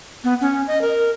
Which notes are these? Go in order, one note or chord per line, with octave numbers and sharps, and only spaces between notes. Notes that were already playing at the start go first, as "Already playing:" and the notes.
B3
C#4
D#5
A#4